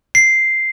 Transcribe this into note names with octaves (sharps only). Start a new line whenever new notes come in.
C7